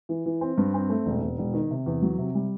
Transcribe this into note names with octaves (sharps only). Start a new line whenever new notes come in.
E3
E3
C4
G2
C4
A3
E1
E1
E1
D#3
C3
E2
F#3
C3
G3